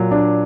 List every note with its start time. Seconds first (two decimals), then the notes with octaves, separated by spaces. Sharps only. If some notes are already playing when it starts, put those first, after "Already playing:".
Already playing: A#2 F#3
0.11 D4